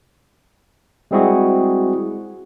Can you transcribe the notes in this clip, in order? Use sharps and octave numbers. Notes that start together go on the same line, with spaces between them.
G3 G#3 C4 E4 F#4 G#4